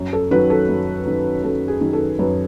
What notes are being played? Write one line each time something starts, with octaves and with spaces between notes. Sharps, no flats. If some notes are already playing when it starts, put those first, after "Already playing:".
Already playing: F#2
A4
D#3 F#3 B4
A4
F#2
D#3 F#3
F#2 A4
G#4
D#3 F#3
A4
F#2 B4